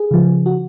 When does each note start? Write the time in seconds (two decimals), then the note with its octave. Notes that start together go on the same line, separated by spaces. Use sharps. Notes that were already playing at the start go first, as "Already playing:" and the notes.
Already playing: G#4
0.11 C#3 F3
0.46 F#4